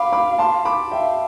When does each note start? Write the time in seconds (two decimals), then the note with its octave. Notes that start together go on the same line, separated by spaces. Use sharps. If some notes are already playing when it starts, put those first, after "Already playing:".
Already playing: F5 B5 D6
0.13 B5 D6
0.39 A5 C6
0.65 B5 D6
0.91 E5 F5 G5